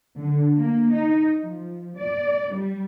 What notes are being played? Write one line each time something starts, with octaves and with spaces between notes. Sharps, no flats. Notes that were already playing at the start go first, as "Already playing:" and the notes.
D3
A#3
D#4
F3
D5
G3